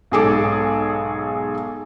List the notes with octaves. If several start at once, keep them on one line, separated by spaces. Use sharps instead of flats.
B1 G#2 G#4 A4 D6